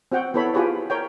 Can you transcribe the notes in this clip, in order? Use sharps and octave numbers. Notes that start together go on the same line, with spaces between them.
C4 F#4 F#5 G5
B3 E4 A4 C#5 B5
F4 G4 G#4 B4 C#5
A#4 C#5 G5